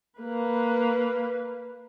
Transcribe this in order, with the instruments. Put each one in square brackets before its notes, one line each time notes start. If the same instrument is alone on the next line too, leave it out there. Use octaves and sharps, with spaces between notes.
[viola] A#3 B4